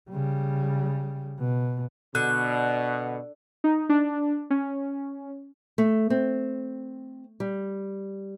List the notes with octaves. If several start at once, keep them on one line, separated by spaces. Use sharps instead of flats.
C#3 G3
B2
B2 D3 F#6
D#4
D4
C#4
A3
C4
G3